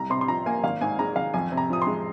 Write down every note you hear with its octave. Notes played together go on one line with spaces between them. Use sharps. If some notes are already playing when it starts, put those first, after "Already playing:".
Already playing: C2 A#5
C3 C6
C6
F3 A#5
A#3 G#5
G#1 F5
G#2 G#5
G#3 A#5
G#1 F5
F2 G#5
C3
A#5
F3 D#6
G#3 C6